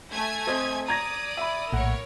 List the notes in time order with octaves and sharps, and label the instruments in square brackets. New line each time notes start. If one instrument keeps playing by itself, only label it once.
[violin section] A3 G#5 G#6
[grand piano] C4 D#5 D#6
[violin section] D5 D#6 [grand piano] A#5 G#6 A#6
[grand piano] E5 B5
[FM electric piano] A#1 A2 F#5 [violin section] A#4 C#5